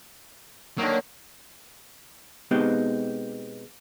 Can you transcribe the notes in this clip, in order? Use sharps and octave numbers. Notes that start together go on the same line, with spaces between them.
D3 D#3 F#3 A#3
B2 G#3 B3 C4 D#4 G4